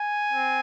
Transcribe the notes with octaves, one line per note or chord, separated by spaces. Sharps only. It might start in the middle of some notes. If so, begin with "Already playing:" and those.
Already playing: G#5
C4